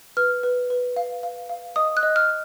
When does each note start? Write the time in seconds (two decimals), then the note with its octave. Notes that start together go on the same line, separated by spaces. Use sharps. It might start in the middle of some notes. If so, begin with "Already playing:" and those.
0.17 B4 F6
0.43 B4
0.70 B4
0.96 F5
1.23 F5
1.49 F5
1.76 D#5 D#6
1.97 F#6
2.03 D#5
2.16 F6